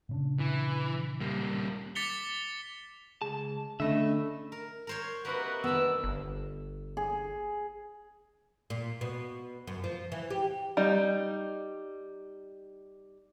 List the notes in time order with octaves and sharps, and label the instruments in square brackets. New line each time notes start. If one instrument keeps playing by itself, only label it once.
[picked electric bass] A#2 C#3 D4
[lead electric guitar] E3
G3 A#3
[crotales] D6 A6 B6 C#7 F7 G7
[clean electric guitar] C#2 A5 [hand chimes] G#4
[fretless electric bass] D3 C#4 [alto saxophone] A3 [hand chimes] D4 B5 [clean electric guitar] D#5 E5
[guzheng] A#4
A#4 C5 C#5
[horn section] C3 A#4 B4 [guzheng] A#3 D#4 F#5 [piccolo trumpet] F#4
[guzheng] D#3 D4 [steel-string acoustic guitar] B3 A5 [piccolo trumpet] E6
[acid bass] G1
[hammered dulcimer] G#4
[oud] A#2
B2
F#2
F3
E3
G4
[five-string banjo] G3 D#4